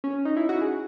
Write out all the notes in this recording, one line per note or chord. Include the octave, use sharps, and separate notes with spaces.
C#4
D#4
E4
F#4
G#4